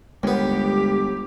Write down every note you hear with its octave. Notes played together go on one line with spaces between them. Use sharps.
G1 D#2 G#3 B3 G4 D6